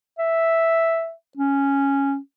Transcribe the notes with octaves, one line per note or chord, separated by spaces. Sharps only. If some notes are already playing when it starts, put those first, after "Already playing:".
E5
C#4